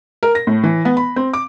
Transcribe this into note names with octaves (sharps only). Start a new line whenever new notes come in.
A#4
A#6
A2
E3
B3
B5
C4
D6